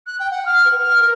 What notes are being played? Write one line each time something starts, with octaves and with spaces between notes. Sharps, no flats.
F#6
G5
F#5
F6
B4
F6
A#4